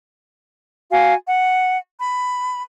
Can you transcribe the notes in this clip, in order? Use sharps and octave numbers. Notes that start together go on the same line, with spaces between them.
F#4 F5 G#5
F#5
B5